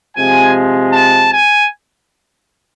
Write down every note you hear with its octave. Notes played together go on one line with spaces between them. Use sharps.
C3 F3 G#3 G#5
A5
G#5